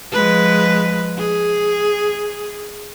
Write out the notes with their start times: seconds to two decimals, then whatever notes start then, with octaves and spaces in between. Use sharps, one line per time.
0.13 F3 G#3 B4
1.18 G#4